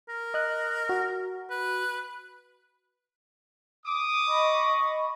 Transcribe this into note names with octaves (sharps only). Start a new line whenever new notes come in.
A#4
D#5 F#6
F#4
B4
D6 D#6
D#5 B5 C#6